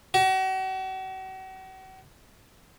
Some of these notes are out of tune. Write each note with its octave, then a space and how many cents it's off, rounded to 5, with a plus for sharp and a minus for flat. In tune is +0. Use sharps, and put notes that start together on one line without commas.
F#4 +40